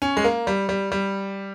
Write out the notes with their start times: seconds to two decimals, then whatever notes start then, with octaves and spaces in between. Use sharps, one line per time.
0.02 C#4
0.17 G#3
0.24 A#3
0.47 G3
0.69 G3
0.92 G3